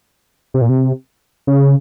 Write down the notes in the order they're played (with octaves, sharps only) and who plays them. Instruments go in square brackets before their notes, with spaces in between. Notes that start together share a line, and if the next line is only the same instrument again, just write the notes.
[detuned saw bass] C3
A#2
C3
C#3